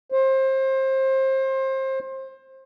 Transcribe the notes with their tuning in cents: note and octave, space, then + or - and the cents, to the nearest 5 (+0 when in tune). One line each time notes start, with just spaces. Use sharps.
C5 +25